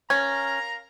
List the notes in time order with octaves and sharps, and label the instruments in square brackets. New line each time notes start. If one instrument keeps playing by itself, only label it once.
[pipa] C#4 [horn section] A#4 F5 A#5 [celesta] G#6